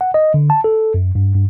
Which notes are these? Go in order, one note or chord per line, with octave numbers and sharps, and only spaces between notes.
F#5
D#5
D3
A5
A4
F#2
G2
G2